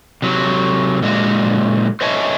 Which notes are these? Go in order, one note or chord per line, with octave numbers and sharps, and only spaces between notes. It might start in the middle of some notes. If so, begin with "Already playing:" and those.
C3 F#3
A#2 D3 G#3 F#4
C5 C#5 D#5 E5 G#5 A5